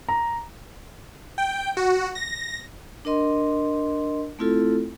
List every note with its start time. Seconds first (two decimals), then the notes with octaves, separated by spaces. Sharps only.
0.09 A#5
1.38 G5
1.77 F#4
2.15 A#6
3.05 D4 A#4 D#5 C6
4.39 A3 C4 E4 F4 A4